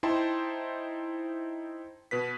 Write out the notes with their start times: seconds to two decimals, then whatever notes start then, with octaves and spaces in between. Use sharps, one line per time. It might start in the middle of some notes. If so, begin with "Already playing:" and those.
0.03 D#4 E4 C5 G5 A5 C6
2.11 B2 B4 B6